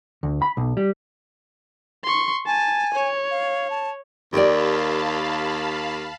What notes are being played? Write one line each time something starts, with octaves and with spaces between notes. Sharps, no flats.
D2
B5
B1
G3
C6 C#6
G#5 A5
C#5
F5
A5
D#2 G4 A#4 D5 F5 A5 B5